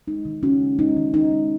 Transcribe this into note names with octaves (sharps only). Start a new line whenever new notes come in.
G#3 D#4
D#3
D#3 C#4 F#4
G#3
G#3 D#4
D#3
D#3 D#4
G#3